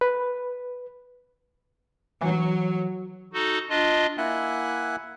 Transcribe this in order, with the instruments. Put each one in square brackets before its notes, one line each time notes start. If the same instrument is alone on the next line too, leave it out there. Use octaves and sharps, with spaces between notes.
[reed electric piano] B4
[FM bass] E3 [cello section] F#3
[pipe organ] D#4 F#4 A4
D4 F4 D#5
[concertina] A#3 E4 E5 F#5 G#5 F#6